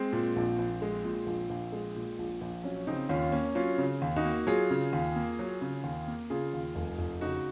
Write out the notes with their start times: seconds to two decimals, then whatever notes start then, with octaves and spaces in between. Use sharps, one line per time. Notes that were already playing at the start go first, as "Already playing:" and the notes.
Already playing: G#3 C4
0.13 A#2
0.36 A#1
0.58 A#1
0.82 G#3
1.05 A#2
1.26 A#1
1.50 A#1
1.73 G#3
1.96 A#2
2.19 A#1
2.41 A#1
2.64 F#3 C#4
2.87 C#3 C4 D#4
3.09 D#2 C#4 F4
3.32 A#3 C#4
3.55 F#3 C#4 F4
3.78 C#3
4.02 D#2
4.16 D#4 F#4
4.25 A#3
4.47 F#3 F4 G#4
4.70 C#3
4.93 D#2
5.16 A#3
5.39 F#3
5.62 C#3
5.84 D#2
6.07 A#3
6.30 C#3 F4 G#4
6.54 D#2
6.75 F1
6.99 F1
7.21 C#3 D#4 F#4